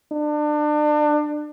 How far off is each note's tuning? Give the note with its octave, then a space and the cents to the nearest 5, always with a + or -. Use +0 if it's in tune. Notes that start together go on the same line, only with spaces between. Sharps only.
D4 +30